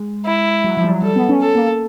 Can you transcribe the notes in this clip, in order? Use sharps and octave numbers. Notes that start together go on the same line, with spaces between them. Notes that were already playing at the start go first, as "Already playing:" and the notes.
Already playing: G#3
E4
F#3
F3
G3
F#3
G3 A4
B3
C#4
A4
A#3